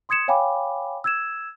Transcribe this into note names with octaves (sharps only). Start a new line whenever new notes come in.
C6 D#6 G#6 C#7 E7
C#5 F5 G5 G#5 B5 D6
E6 G#6 E7